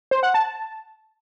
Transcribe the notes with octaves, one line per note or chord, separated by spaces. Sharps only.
C5
F#5
A5